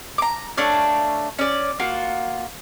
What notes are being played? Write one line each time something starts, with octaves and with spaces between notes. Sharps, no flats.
A#5 D6
A3 D4 C#5 F5
C#4 D5
A#3 F4 F#4